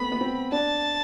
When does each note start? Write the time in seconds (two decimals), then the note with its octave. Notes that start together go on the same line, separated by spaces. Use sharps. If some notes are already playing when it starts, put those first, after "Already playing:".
Already playing: A3 B3 C4 B5
0.12 B3
0.21 C4
0.52 D4 A5